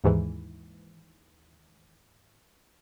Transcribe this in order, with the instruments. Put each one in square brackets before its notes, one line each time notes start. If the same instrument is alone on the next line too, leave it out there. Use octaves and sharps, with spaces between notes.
[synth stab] D#2 G#2 E3